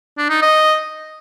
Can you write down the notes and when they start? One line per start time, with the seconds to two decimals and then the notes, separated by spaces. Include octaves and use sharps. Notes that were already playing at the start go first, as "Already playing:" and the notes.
0.18 D4
0.30 D#4
0.42 D#5